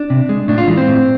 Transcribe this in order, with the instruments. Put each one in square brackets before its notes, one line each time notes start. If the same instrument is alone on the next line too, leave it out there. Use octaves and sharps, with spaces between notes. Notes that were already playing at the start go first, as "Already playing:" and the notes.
Already playing: [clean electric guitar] D4
C3
G#3
A2 D4
F4
E3 G#3
C4
A2